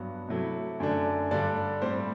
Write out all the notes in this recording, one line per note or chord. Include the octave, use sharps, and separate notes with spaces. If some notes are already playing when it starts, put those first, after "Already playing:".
Already playing: G2 F#3 B3
C3 F#3 A3 E4
F#2 D3 A3 D4
G2 D3 G3 D4 D5
A2 G3 C4 E4 C5